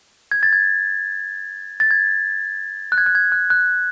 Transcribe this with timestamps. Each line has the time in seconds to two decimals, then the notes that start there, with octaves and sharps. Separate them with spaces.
0.31 G#6
0.43 A6
0.53 G#6
1.80 A6
1.91 G#6
2.92 F#6
2.98 G#6
3.06 F#6
3.15 G#6
3.32 F#6
3.50 F#6